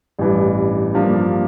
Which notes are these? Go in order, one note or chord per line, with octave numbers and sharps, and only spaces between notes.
A1 G2 E3 G3 D4
G2 F3 A#3 D4